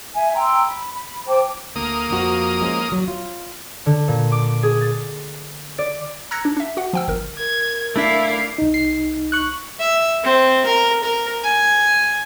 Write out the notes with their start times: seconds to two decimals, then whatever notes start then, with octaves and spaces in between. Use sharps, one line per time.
0.15 E5 G#5
0.35 G5 A#5 C6 E6
0.67 B5
0.95 B5
1.27 C5 G5 A5 D6
1.76 D2 A#3 D#6
2.11 F2 F3 F#4
2.61 F3 G#3 C#4
2.90 E2 F#3
3.08 F4
3.86 D3
4.08 A#2
4.32 D6
4.63 G#4
4.81 A6
5.78 D5
6.31 A#5 E6 F#6 G#6 A#6 C#7
6.45 D4
6.57 D4 E5
6.77 F#4 F#5
6.93 F3 G5 E6
7.08 G1 A#4
7.38 A#4 G#6
7.96 A3 D4 E4 D5 E5 F5
8.58 C2 D#4
8.74 C7
9.32 C#6 F#6
9.80 E5
10.24 C4
10.66 A#4
11.03 A#4
11.44 G#5